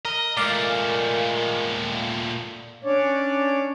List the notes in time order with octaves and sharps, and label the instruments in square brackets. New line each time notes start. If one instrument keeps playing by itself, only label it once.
[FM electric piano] A#4 [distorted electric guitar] D#5
[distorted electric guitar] A#2 A3 [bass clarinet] G#3 [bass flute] A#4 [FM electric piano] D5 F5
[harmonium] C#4 D4 C#5 D5